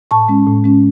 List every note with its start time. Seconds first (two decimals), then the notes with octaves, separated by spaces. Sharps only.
0.11 A2 A5 C#6
0.28 G#3 C#4
0.47 A2
0.64 G#3 C#4